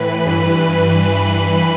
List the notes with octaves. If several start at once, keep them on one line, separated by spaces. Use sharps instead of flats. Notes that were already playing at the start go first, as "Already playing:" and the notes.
Already playing: A2 E3 B4 B5
G2 E3